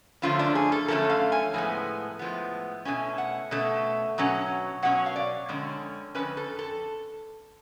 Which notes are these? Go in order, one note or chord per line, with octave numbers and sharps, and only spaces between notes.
F#2 D3 F3 A3 C#4 F4
D4
G#4
A4
F#2 D3 F3 A3 C#4 A4
F5
G#5
A2 F3 G#3 B3 G#5
A2 F3 G#3 B3
B2 A3 C#4 G#5
F#5
B2 A3 C#4
B2 F#3 C#4
B2 F#3 C#4 F#5
F5
D5
F2 D3 G#3 C#4
F2 D3 G#3 C#4 B4
A4
A4